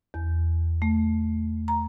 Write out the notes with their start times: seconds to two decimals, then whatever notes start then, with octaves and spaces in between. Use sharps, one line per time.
0.14 E2
0.82 A3
1.68 A#5